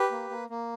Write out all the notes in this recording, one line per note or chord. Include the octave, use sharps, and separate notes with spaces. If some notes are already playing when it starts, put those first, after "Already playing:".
Already playing: G4 B4
A#3
A#3
A#3